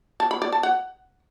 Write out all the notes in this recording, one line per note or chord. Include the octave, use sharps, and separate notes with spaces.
A5
B5
D5
A5
F#5